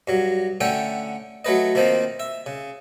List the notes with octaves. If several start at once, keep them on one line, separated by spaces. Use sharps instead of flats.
G2 F#3
D3 A3 C#4 E5 F#5 G5
F#3 A3 B4 D#5
D#3 F3 A#3 C4 D#4
E5
C#3